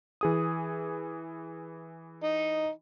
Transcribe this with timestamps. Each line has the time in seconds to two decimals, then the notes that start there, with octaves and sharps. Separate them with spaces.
0.21 E3 G#4 D#6
2.23 D#4